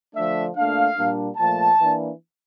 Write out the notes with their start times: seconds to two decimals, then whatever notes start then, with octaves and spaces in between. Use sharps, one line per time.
0.16 D3 F3 A3 D4 E5
0.56 A#2 A3 D4 F5
0.96 A#2 G3 A#3 D4
1.37 A#2 F3 A3 A5
1.77 E3 A#3 D4